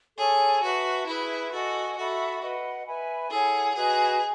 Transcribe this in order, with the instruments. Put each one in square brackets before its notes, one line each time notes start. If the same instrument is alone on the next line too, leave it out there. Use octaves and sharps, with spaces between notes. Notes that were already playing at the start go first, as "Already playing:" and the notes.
[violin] G#4 [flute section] A4 C#5 G#5 C#6
[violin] F#4 [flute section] B4 E5 A5
[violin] E4 [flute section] G#4 B4 E5 B5
[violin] F#4 [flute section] A4 D#5 G#5
[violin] F#4 [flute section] A4 E5 B5
[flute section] B4 D#5 F#5
B4 E5 G#5 B5
[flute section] E4 A4 C#5 F#5 [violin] G#4
[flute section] F#4 B4 D#5 [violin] G#4